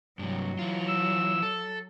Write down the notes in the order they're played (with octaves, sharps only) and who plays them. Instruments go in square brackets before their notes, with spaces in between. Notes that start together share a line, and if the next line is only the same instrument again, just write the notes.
[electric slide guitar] G2 C3 [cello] F#3
[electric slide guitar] E3 F4
[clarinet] E6
[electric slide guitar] A4